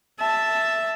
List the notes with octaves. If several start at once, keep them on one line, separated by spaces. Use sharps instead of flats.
E5 A5